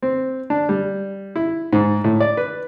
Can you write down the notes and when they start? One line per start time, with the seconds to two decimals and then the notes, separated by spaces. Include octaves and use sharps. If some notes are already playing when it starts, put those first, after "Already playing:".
0.02 C4
0.50 D4
0.69 G3
1.36 E4
1.73 G#2
2.04 A2
2.20 D5
2.37 B4